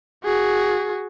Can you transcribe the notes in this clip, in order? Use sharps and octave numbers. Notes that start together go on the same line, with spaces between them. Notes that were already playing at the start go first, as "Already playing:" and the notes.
F#4 G#4